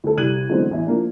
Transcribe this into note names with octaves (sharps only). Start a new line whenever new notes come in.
D2 A4
C2 G3 F#6 G#6 D#7 F#7
B2 D3 E3 F#3 G#3 C4
A1 E2 E5
F3 A#3 D4